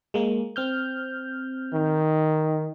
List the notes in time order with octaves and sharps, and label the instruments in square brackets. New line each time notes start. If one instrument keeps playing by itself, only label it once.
[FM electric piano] G#3 A#3
C4 F6 G6
[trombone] D#3